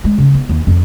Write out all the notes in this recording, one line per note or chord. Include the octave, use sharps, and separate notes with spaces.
G#3
C#3
B3
D#2
F2